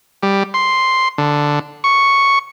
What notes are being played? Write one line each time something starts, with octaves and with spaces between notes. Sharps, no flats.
G3
C6
D3
C#6